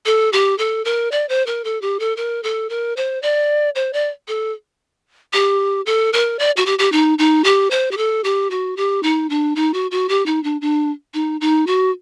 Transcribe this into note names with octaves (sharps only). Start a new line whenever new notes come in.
A4
G4
A4
A#4
D5
C5
A#4
A4
G4
A4
A#4
A4
A#4
C5
D5
C5
D5
A4
G4
A4
A#4
D5
F#4
G4
G4
D#4
D#4
G4
C5
G4
A4
G4
F#4
G4
D#4
D4
D#4
F#4
F#4
G4
D#4
D4
D4
D#4
D#4
F#4